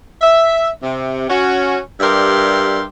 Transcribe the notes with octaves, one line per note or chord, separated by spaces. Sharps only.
E5
C3
C#4 F#4
G2 G4 A#4 D5 E5 C6